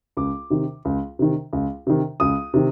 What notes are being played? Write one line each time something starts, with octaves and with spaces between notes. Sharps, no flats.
C#2 D6
C3 D#3
C#2
C3 D#3
C#2
C3 D#3
C#2 D#6
C3 D#3